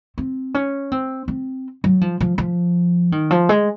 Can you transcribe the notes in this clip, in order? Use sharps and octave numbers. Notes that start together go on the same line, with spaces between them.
C4
C#4
C4
C4
F#3
F3
F3
F3
D#3
F3
G#3